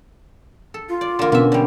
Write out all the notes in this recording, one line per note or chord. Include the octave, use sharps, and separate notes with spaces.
A4
F4
D5
D3 A#3
B2 A#3 B3 C#4 E5
D3 G3